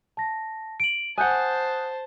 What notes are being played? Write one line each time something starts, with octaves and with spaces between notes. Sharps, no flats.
A5 A#6
D7 F#7
C5 F#5 G#5 A5 D#6 F#6 G6